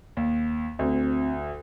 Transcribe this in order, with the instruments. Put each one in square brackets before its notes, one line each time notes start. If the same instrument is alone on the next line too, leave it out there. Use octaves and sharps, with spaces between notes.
[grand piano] D#2
[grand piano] D2 [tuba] C4